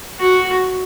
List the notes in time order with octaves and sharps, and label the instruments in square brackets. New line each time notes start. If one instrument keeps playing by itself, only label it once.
[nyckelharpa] F#4